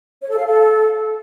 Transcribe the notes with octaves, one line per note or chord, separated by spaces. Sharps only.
C#5
A4
F5
A4